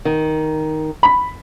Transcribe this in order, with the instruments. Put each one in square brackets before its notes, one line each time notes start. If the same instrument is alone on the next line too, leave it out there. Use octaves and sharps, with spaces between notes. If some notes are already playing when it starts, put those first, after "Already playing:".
[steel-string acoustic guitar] D#3
[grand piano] B5